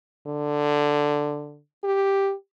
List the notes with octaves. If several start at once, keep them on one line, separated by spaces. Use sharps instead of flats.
D3
G4